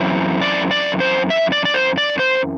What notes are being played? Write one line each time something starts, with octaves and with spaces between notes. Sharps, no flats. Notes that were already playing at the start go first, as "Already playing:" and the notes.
Already playing: F#2 E3 C4
D5
D5
C5
E5
D5
D5
C5
D5
C5